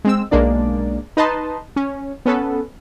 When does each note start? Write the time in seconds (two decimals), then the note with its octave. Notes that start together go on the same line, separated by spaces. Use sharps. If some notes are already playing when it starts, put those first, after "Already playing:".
0.05 G#3 C4 E6
0.31 B1 G#3 A#3 D4 D5
1.17 D#4 B4 D#5 A5 C6
1.76 C#4
2.26 B3 C#4 A4 B4